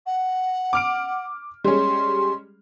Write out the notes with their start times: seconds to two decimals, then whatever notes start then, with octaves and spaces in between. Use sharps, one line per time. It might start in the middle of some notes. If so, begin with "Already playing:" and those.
0.06 F#5
0.73 D6 F6 D7
1.64 G3 G#3 C#4 C6